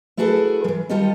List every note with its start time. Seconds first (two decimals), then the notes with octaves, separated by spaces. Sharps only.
0.17 A3 E4 F#4 G#4 A4 B4
0.64 E3 F3
0.89 D#3 G3 F4 G4 A4 D#5